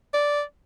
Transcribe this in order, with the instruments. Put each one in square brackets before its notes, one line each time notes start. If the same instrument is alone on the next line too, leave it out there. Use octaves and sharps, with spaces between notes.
[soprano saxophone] D5